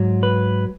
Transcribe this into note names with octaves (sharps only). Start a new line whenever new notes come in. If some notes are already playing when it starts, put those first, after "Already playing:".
Already playing: G#2 F#3
B4